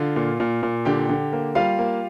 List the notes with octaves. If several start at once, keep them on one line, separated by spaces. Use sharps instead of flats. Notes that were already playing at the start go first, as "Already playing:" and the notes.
Already playing: D3 F4
A#2
A#2
A#2
D3 G4 G5
D3
A#3
G3 F4 F5
A#3